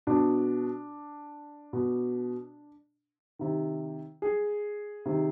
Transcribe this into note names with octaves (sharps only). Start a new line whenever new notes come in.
B2 D4
B2
C3 D#3
G#4
C3 D#3